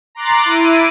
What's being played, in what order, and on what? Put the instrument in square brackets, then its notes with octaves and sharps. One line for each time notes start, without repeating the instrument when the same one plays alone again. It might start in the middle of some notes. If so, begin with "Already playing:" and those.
[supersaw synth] A#5 C6 D6 F#6 A6 C7
E4 D7 D#7